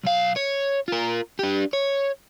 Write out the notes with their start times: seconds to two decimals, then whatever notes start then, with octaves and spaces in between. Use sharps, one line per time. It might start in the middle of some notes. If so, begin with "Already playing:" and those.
0.04 B1 F5
0.37 C#5
0.88 F4 A#4
1.39 D4 G4
1.73 C#5